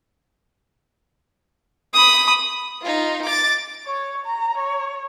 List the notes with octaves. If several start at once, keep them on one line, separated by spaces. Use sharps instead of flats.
B5 D#6
D#4 F4
D6 A6
C#5
A#5
C#5